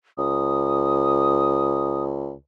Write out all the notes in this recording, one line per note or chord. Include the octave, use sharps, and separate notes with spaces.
C#2 D#6